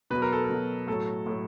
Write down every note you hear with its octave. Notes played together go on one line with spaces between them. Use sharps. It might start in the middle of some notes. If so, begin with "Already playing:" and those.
B2 F#3 B4
A#4
A4
A#4
B2 F#3
A2 F#3 A4
A2 F#3